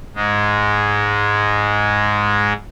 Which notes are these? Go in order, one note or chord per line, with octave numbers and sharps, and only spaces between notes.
G#2 G#3